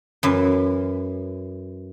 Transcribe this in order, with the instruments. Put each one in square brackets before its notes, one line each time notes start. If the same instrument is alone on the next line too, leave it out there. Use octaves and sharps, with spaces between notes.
[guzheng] F#2 E3